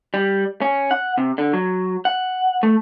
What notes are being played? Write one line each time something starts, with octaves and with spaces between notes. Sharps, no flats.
G3
C#4
F#5
C3
D3
F#3
F#5
A3